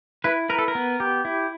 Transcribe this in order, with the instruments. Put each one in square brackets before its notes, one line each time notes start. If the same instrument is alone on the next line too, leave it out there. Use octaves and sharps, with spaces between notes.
[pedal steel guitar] E4 [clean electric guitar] B4
[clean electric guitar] A#4 [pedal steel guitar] B4
[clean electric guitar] A4
A#4
[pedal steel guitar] B3
G4
E4